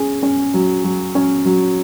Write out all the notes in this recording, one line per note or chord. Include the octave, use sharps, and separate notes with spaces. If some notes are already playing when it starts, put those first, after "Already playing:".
Already playing: C#4 G#4
C#4
F#3
F#3
C#4
F#3